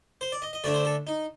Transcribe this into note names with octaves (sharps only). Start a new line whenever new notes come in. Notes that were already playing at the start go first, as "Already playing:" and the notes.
C5
D5
D#5
D#5
D2 D3 A3 D4 D5
C5
A4
D#4